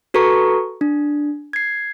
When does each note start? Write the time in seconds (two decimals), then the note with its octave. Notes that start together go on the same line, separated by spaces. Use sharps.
0.14 F#4 A4 B4 A#5 C#6
0.81 D4
1.53 G#6 C7